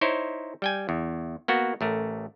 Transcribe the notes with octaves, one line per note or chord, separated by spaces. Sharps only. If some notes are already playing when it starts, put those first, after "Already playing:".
D#4 E4 C5 C#5
G3 G5 G#5
E2
A#3 B3 F#4
A1 A3 A#4